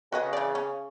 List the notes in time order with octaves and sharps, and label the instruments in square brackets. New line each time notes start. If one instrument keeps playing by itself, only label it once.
[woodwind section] C#3 [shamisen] F#4 B4 D#5
[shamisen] E3 D5
C#4